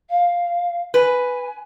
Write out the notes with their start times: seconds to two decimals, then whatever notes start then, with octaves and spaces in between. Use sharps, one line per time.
0.09 F5
0.94 B4 G#5